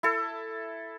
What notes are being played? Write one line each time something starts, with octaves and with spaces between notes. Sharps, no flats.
E4 A4